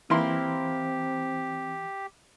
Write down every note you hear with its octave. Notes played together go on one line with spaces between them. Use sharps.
E3 A#3 C4 E4 G4 C6